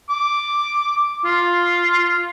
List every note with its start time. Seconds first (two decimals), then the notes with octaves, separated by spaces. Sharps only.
0.10 D6
1.25 F4